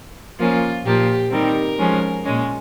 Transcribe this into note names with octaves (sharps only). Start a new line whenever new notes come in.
F3 A#3 C#4 F4
A#2 F3 A#3 G4
D#3 G3 C4 A#4
F3 G#3 C#4
A#2 G#3 C#4